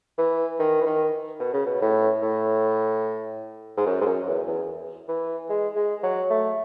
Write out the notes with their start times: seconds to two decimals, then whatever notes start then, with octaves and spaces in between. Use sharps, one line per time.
0.18 E3
0.59 D#3
0.81 E3
0.86 D#3
1.40 B2
1.54 C#3
1.66 B2
1.82 A2
2.23 A2
3.77 G#2
3.86 F#2
4.01 G#2
4.06 F#2
4.27 E2
4.47 E2
5.08 E3
5.49 G#3
5.76 G#3
6.03 F#3
6.30 A3